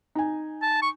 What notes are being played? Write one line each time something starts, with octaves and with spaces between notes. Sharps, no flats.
D#4 G#5
A5
C#6